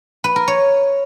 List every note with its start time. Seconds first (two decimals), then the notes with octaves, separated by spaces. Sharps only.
0.24 B4
0.36 A#4
0.48 C#5